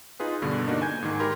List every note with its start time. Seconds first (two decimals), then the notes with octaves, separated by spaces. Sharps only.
0.20 D#4 F4 G#4 B4
0.42 G2 B2 D3
0.67 A#3 D4 D#4 F#4
0.82 G#5 G6 G#6
1.02 G#2 D#3
1.19 G4 A#4 B5 C6